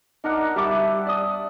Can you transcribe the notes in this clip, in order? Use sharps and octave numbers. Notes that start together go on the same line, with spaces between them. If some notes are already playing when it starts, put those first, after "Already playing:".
D4 D#4 A#4 F#5
G3 E5 A5 D6
D5 D#6